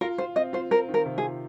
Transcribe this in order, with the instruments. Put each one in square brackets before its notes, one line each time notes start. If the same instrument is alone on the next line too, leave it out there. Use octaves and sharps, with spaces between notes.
[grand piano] F4 [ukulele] A#4
[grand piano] F4 [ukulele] C5
[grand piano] C4 [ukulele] D#5
[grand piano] F4 [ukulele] C5
[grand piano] C4 [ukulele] A#4
[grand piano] D#3
[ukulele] A#4
[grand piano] C3
[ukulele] G#4
[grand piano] F4